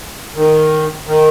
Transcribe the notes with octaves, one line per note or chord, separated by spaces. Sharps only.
D#3
D#3